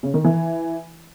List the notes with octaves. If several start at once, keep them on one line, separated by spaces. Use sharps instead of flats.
C#3
D#3
E3